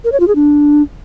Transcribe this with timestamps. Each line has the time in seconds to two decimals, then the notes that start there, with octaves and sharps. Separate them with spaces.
0.04 A#4
0.12 C#5
0.20 F4
0.28 G#4
0.35 D4